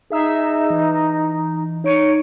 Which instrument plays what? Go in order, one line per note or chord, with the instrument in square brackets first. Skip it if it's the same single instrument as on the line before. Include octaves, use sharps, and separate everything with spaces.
[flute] D#4 [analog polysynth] G#4 E5 E6
[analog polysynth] E3
[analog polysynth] D#4 D7 D#7 [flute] C#5